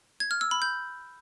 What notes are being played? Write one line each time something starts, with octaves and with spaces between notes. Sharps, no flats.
G#6
F6
E6
B5
G6